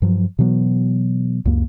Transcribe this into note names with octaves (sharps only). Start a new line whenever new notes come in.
G2 F3 F#3
B2 E3 F#3 B3
C#2 F#2 A#3